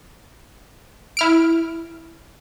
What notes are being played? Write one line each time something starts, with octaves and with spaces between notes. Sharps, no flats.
E4 F6 D7